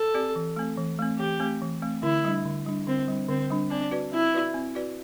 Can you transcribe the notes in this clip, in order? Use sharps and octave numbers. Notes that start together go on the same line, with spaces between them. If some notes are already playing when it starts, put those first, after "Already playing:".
Already playing: A4
C4 G4 D5
E3
A3 C4
E3
A3 C4
E3 G4
A3 C4
E3
A3 C4
D3 E4
G3 D4
D3
G3 D4
D3 C4
G3 D4
D3 C4
G3 D4
C4 D4
F#4 B4 D5
C4 E4
F#4 B4 D5
C4
F#4 B4 D5